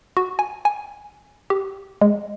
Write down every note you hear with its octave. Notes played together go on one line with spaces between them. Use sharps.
F#4
G#5
G#5
G4
G#3